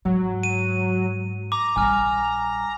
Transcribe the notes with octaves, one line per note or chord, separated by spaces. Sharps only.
G#2 F#3
D#7
A#5 D6
A#1 G3 G#5 F6